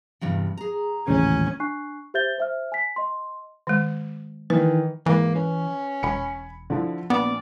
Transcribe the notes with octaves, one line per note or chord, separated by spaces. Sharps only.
E2 G2 C3
G#4 A#5
D#1 A1 C#3 C#4 G#5
D4 G#5 C#6 F#6 C7
G4 C5 E5 G6 A6 G7
C5 E5 F6
G#5 B6
D#5 C6
D#3 G#3
D#3 E3 B4
G#2 E3 A#3
C#4 B4
E1 G#5 B5 C#7
D3 F3 E4
A#1 B3 D5